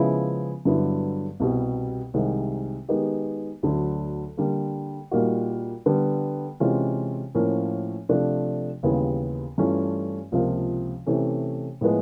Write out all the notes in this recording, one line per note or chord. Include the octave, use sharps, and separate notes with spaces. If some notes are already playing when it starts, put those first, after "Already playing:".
Already playing: C#3 F3 G#3 B3 E4
G2 D3 F#3 B3 E4
C2 B2 G3
C2 C3 D#3 G#3
D#3 G#3 B3 D#4 G4
D2 D3 F#3
D3 G3 A#3
A#2 G3 A#3 D#4 F#4
D3 G3 B3
C3 E3 G#3 C#4 F4
A2 F3 A#3 C#4
C3 F3 A3 D4
D#2 C#3 E3 G3 B3
G2 E3 A3 C#4 F4
C#2 C3 F3 A#3
C3 E3 A3 C#4
A2 F3 G#3 B3